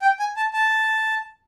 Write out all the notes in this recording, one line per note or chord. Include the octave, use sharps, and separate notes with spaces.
G5
G#5
A5
A5